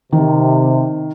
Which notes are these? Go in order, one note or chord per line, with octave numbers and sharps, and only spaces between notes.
C3 D#3